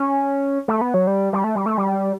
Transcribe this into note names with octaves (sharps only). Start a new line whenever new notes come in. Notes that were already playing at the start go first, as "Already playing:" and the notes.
Already playing: C#4
A3
B3
F#3
G3
G3
A3
G3
A3
G3